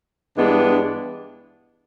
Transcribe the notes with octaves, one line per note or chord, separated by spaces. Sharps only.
G2 E3 G#3 B3 D4